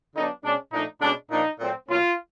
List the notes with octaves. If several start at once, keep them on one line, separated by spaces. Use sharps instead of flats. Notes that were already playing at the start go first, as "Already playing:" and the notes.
D3 F#3 B3 D4 D#4
B2 G#3 C#4 D4
A#2 F3 A3 D4 D#4
B2 G#3 C#4 D4
A#2 F3 A#3 D4 D#4
A#2 F#3 A3 C4
B2 F#3 A#3 C#4 F4